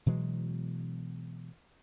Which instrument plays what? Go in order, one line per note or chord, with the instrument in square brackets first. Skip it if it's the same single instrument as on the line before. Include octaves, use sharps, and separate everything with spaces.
[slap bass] B2 E3 F#3 G#3